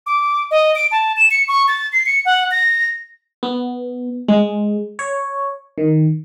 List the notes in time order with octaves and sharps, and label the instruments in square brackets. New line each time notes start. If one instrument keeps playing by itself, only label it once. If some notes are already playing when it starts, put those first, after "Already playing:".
[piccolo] D6
D#5
D7
A5
E7
C#7
C#6
A6
C7
C#7
F#5
A#6
[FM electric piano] B3
G#3
C#5
D#3